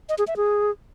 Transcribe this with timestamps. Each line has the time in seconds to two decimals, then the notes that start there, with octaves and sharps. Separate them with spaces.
0.09 D#5
0.18 G#4
0.27 E5
0.37 G#4